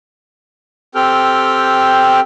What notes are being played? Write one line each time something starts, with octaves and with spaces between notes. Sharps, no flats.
C4 G4 A4 G5 F6